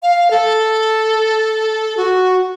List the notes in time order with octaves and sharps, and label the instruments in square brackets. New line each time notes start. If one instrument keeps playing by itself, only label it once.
[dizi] F5
A4
F#4